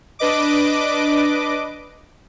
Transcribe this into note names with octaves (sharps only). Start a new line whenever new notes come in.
D4 B4 D#5 D6